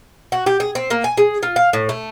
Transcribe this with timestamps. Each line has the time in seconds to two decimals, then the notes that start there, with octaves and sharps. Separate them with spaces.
0.32 F#4
0.46 G4
0.60 G#4
0.75 C4
0.90 A#3
1.04 G#5
1.17 G#4
1.43 F4
1.56 F5
1.73 A2
1.89 A3